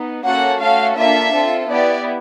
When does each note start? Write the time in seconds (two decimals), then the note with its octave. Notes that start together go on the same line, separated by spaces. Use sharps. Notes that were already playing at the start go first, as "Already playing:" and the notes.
Already playing: B3 D#4
0.25 A#3 C#4 F#4 A4 F#5
0.61 A3 C#4 F#4 A4 F5
0.98 A#3 D4 F4 A4 E5
1.34 C4 F4 A4
1.70 B3 E4 G4 D5